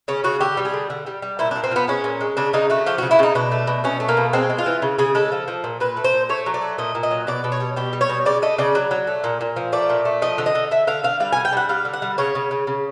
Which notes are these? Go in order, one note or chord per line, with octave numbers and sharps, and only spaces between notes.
C#3 C#4
C#3 F#4
D3 G4
G3
G#4
D3
D3
G3
G3
A#2 E4
D4
A#2
C4
F3 B3
G#3 C#4
A#2
G#3
C#3 D4
C#3 D#4
A3 F#4
F3 G4
F#4
C#3
E4
C#3 D#4
B2 D4
A3
B2
B2 C#4
A3
A#3
B2
G#3 C4
G#3
F4
E3
C#3
C#3 G#4
G#3 A4
F3
F3
A#2
A#2 B4
A3
C5
A#2
A3 C#5
F#3
D5
A3
A#2 D#5
A#2
D#5
F#3
B2 D5
B2
C#5
G3
B2 G4
G3
C#5
B2
C#3 D5
A3 D#5
C#3 D5
F#3
F#3
A3
A#2
A#2
F3
A3 D5
A#2
A3
F3 D#5
D3
D#5
D3
D3 E5
D3 F5
D3 F5
G3 F5
G#5
D3
G5
G3 F#5
G3 F5
D3
F#5
G3
C#3 C#5
C#3
C#3
C#3